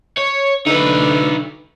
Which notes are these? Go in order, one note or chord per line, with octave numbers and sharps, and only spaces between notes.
C#5
D3 D#4 B4